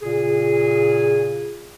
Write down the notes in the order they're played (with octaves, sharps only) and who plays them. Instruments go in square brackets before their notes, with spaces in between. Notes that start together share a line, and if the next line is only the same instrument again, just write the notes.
[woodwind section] A#2 C#3 G#4